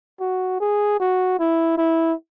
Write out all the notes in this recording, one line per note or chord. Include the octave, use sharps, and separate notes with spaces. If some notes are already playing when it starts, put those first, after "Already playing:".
F#4
G#4
F#4
E4
E4